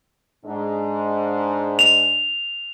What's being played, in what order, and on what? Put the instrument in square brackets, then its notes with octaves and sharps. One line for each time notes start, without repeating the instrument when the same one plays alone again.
[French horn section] G#2 G#3 D4
[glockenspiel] F7